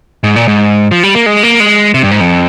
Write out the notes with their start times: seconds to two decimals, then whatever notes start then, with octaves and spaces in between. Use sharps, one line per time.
0.24 G#2
0.36 A#2
0.48 G#2
0.91 F3
1.03 G3
1.15 A#3
1.26 G#3
1.43 A#3
1.60 G#3
1.94 C3
2.03 G2
2.11 G#2
2.20 F2